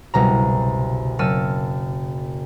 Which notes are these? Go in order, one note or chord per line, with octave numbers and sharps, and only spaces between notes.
F#1 C2 B2 A#5
F#1 A5 E6 F6 C#7 D#7